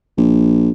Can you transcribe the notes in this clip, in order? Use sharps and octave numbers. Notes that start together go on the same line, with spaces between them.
A#1